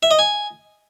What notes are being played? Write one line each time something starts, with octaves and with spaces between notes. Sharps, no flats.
E5
D#5
G#5